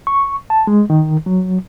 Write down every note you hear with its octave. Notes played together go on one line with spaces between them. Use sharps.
C#6
A5
G#3
D#3
F#3